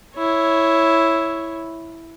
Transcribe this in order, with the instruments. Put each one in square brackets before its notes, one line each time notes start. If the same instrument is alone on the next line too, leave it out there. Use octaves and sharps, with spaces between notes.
[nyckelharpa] E4 C#5